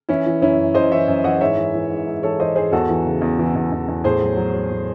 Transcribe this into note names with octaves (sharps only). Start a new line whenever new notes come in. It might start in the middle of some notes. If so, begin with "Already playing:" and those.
E3 C#4 E4
E3
F#2 C#4 E4
F#2
F#2 C5 D#5
E3 C#5 E5
F#2
E3 D#5 F#5
G#2 C#5 E5
E3
E3
G#2
G#2
E3 A4 C#5
E3 C5 D#5
G#2 G#4 C5
E2 F#4 A4
E3
C#3
E2
E3
E2
E2
E2
A2 G#4 C5
F#3
F#3
F#3
A2